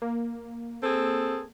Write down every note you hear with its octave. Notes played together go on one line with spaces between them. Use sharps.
A#3
C4 G#4 A4